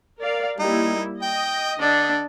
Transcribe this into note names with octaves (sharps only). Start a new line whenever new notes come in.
A#4 D5 F5
G3 A#3 D#4 E4
D#5 G5
D3 D4